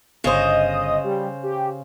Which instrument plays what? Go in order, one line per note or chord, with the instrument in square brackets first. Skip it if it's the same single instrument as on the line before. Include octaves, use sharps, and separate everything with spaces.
[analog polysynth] G1 D#5 D#6 [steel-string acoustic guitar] C#3 C5
[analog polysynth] G3
G4